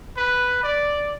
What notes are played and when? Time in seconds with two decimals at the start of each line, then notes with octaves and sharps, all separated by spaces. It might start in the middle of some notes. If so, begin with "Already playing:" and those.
0.17 B4
0.63 D5